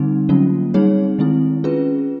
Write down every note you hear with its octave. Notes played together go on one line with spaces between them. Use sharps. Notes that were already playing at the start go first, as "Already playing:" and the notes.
Already playing: D3 G3 C4 D#4
D3 F#3 A#3 C#4 F4
G3 C4 D#4 G#4 C#5
D#3 G#3 C4 E4
C#4 F4 G#4 B4